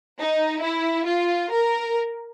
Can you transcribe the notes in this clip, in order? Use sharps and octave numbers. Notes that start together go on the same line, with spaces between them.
D#4
E4
F4
A#4